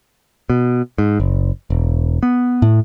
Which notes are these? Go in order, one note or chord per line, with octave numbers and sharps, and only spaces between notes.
B2
G#2
F#1
E1
B3
A2